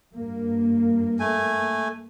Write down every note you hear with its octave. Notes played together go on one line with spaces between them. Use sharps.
G2 A#3
A3 G#5